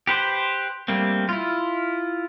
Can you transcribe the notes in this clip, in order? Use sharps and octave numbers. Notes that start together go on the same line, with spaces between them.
G4 B4 C5
G3 A3 A#3 C4
E4 F4